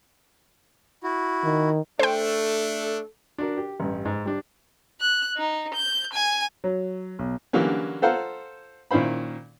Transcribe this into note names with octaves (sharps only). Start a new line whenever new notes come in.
E4 F#4
D#3
A3 D4 A4 C5 G5
D4 F#4 A#4
G4
A1 G2
G#2
G3 D4
F#6
D#4
G6
G#5
F#3
B1
D3 E3 F#3 G3 A#3 C#4
F4 A4 C5 F5 F#5 A#5
A#2 D#3 C#4 E4 C5 B5